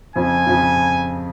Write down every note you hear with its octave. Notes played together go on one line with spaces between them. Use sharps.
F2 C#3 F3 G#5
F2 C#3 F3